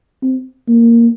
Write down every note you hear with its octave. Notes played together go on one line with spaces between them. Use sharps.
C4
A#3